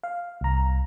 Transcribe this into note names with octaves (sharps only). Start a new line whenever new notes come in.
F5
C2 A#5